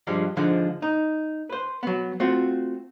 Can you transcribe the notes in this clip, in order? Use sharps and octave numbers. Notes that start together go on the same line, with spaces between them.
G2 F3 G3 G#3
G#2 D3 F3 G#3
D#4
B4 C5
F#3 B3
A3 C4 F4 F#4